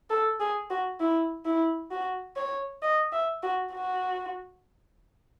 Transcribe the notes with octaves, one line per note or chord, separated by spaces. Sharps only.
A4
G#4
F#4
E4
E4
F#4
C#5
D#5
E5
F#4
F#4